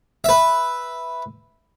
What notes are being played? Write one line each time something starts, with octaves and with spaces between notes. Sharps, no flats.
B4 E5